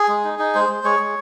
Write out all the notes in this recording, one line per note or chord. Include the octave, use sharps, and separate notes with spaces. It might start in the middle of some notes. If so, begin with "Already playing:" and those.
Already playing: G#4
G#3
D#4
D#4
G#3 C5
G#3
G#3 C#5
G#3